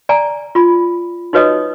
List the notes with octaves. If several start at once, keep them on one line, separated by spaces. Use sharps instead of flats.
D5 G#5 A#5
F4 B5
D#4 F#4 B4 C#5 D#5 D#6